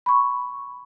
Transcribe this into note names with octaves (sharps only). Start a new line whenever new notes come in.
B5 C#6